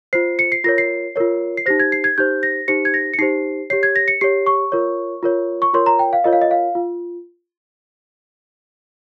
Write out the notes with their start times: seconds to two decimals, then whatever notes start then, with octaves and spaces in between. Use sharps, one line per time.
0.13 F4 C5 C7
0.39 C#7
0.52 C7
0.64 F4 A#4 C#5 A#6
0.78 C7
1.16 F4 A#4 C#5
1.57 C7
1.66 D#4 G4 C5 A#6
1.80 G#6
1.92 C7
2.04 G#6
2.18 D#4 G4 C5 G6
2.43 A#6
2.68 D#4 G4 C5 C#7
2.85 G#6
2.94 A#6
3.13 C#7
3.19 D#4 G4 C5 C7
3.70 G4 C#5 C7
3.83 G#6
3.96 A#6
4.08 C#7
4.21 G4 C#5 C7
4.46 C#6
4.72 F4 A#4 C#5
5.23 F4 A#4 C#5
5.62 C#6
5.73 F4 A#4 C#5 C6
5.86 A#5
5.99 G5
6.13 F5
6.24 F4 A#4 C#5 D#5
6.33 F5
6.42 D#5
6.51 F5
6.75 F4